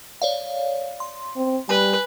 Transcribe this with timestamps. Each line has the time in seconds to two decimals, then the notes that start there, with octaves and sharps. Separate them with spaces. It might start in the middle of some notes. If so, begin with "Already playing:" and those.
0.22 C#5 D5 F5
1.00 C6
1.36 C4
1.69 G3 B4 G#5